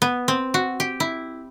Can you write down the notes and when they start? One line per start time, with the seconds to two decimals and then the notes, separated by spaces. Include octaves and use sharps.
0.02 B3
0.28 C4
0.54 F#4
0.80 G4
1.00 E4